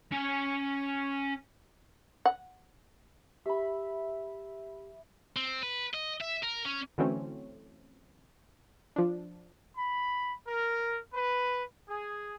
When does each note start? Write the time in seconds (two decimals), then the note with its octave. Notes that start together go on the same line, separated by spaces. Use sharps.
0.13 C#4 G#5
2.26 F#5
3.46 G4 E5 B5
5.37 C4
5.63 B4
5.94 D#5
6.21 E5
6.44 A#4
6.66 C#4
6.98 D3 E3 F#3 A3 C4 C#4
8.96 F3 D4
9.77 B5
10.46 A#4
11.14 B4
11.89 G#4